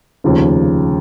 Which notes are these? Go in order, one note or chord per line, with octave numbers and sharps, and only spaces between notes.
F1 D#2 C#3 F3